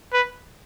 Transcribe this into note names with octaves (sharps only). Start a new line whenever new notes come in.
B4